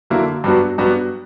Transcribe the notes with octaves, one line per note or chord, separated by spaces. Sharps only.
D3 F#3 A#3 E4
G2 F#3 B3 D4 F#4
G2 F#3 B3 D4 F#4